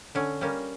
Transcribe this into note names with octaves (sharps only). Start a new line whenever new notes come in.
D3 C#4
G3 A#3 C#4